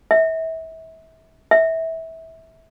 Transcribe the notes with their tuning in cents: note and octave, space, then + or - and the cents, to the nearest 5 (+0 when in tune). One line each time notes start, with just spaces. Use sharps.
E5 -30
E5 -20